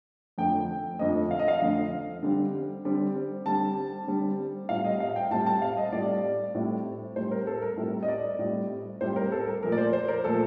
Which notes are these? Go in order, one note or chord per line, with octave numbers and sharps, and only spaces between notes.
F2 D3 F3 A3 G5
F2 D3 F3 A3 D#5
F5
D#5
F5
F2 D3 F3 A3
D3 G3 C4
D3 G3 C4
D3 G3 C4 A5
D3 G3 C4
A2 G3 C4 F5
D#5
F5
G5
A2 G3 C4 A5
A5
F5
D#5
A2 G3 C4 D5
A2 G3 C4
A2 G3 C4 C5
A#4
A4
A#4
A2 G3 C4
D#5
D5
A2 G3 C4
A2 G3 C4 C5
A#4
A4
A#4
A#2 F3 A3 A#4
D5
C5
C5
A#4
A#2 F3 A3 A4